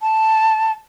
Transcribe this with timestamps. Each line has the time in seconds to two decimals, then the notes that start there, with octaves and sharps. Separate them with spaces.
0.01 A5